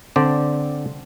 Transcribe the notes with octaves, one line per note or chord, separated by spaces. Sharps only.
D3 C4 D5 G5